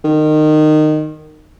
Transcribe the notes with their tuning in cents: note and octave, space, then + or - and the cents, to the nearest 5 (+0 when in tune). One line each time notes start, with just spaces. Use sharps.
D#3 -20